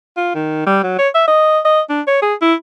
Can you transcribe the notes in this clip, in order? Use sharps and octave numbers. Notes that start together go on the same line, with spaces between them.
F4
D#3
G3
F#3
C#5
E5
D#5
D#5
D4
C#5
G#4
E4